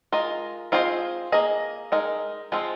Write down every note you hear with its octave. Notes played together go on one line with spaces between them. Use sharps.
G#3 F4 A#4 D#5
C4 F4 G#4 C5 D#5
A#3 G#4 D#5
G#3 D#4 A#4 D#5
F3 G#3 C4 F4